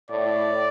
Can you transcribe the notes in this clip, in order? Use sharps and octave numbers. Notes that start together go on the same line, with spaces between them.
A2 D5